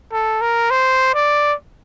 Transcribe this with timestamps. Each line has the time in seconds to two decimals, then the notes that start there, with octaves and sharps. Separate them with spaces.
0.13 A4
0.41 A#4
0.71 C5
1.15 D5